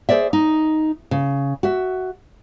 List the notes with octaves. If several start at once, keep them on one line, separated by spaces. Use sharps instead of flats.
G#4 A4 C5 D5 E5
D#4
C#3
F#4 E5